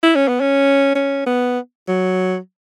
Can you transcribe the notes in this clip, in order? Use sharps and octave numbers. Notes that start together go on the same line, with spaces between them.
E4
C#4
B3
C#4
C#4
B3
F#3